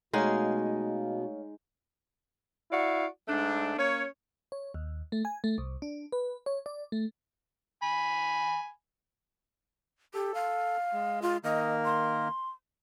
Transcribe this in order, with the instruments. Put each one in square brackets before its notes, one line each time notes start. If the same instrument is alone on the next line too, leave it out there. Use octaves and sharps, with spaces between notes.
[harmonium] B2 [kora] G#3 D#4 F#5 [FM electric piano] A3 C#5 F5
[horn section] E4 F#4 D5 F5
G#2 A3 D4
A#3 C#4 C#5
[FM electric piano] C#5
D#2
A3
G#5
A3
C2
D4
B4
C#5
D5
A3
[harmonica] G#5 B5
[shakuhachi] G4 [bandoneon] A4
[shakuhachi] F5
[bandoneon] G#3
[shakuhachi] F4
[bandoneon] D#3 A#3 A#4 [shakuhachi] D#5
[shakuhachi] C6